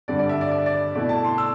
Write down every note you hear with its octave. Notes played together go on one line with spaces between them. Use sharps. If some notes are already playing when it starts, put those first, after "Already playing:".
G2 D3 G3 D4 D5
D5
E5
D5
D5
D5
B2 A3 E4 D5
A5
C6
E6